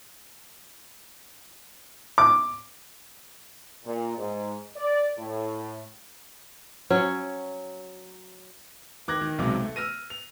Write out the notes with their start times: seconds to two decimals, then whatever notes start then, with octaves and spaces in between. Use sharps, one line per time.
2.18 D6
3.85 A#2
4.17 G#2
4.76 D5
5.18 A2
6.90 F#3 C#4
9.08 D#3 D6 F#6 G#6 A#6
9.21 D#3
9.38 B1 C3 F#3 G#3 D6
9.62 A3
9.76 E6 F6 A#6 D#7
10.10 F7